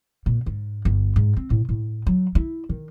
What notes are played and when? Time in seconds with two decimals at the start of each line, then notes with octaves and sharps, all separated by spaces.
0.26 A#2
0.46 G#2
0.85 G1
1.16 G#2
1.36 C4
1.50 A2
1.69 A2
2.07 F#3
2.35 E4
2.69 D#3